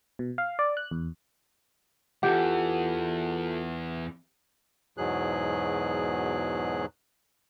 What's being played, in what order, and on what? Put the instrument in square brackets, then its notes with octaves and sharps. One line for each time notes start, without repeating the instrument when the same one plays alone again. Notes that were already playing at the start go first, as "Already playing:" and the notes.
[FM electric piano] B2
F5
D5
F#6
E2
[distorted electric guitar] E2 E3 [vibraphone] F4 A4 A5 [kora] G4 [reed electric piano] F#5
[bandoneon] E2 G#2 B2 F#3 G#4 F#6